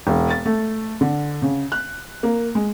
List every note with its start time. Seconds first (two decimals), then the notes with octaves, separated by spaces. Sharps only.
0.07 E1
0.30 A6
0.45 A3
1.01 D3
1.42 C#3
1.72 F#6
2.23 A#3
2.55 G#3